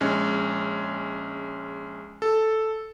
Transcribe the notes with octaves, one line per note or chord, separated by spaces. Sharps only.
A#1 G#3 C#4
A4